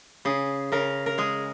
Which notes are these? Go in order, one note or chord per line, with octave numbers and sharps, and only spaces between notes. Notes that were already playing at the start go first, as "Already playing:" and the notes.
C#3 G#4
C#3 A#4
A#4
G#3 G#4